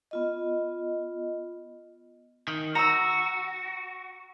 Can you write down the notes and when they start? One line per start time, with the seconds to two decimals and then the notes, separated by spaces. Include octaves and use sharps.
0.11 B3 F4 D#5
2.48 D#3
2.75 F#4 A#5 E6